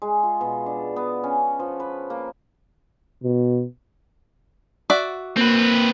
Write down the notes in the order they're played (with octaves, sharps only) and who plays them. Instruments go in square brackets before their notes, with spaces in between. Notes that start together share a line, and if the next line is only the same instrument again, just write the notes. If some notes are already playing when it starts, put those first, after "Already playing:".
[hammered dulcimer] G#3
F4
B2
D4
B3
C#4
F3
B4
A#3
[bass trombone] B2
[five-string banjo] F#4 D5 E5
[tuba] A#3 [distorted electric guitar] C4 B4